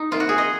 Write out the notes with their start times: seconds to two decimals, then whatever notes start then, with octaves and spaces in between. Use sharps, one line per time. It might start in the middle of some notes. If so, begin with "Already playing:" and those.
Already playing: D#4
0.11 C3 D#3 A#3 F4
0.20 F#4
0.29 G#4
0.38 D#5